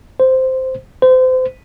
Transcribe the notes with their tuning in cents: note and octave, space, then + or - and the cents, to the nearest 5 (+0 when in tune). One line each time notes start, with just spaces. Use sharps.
C5 -5
C5 -30